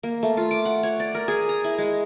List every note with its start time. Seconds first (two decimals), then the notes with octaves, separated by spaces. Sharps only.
0.03 A#3
0.23 A3
0.37 F4
0.51 D6
0.65 F#5
0.83 C#5
1.00 D5
1.15 A#4
1.28 G#4
1.49 A#5
1.64 E4
1.78 G#3